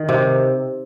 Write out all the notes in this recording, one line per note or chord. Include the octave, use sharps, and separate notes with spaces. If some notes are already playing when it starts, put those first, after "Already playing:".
Already playing: D#3
C3